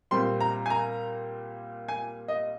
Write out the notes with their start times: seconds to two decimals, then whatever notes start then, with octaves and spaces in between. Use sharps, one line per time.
0.11 A#2 G3 C4 C6
0.40 A#5
0.66 G#5
0.70 A#5
1.88 G#5
2.28 D#5